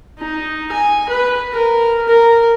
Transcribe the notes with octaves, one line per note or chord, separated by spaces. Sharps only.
D#4
G#5
B4
A#4
A#4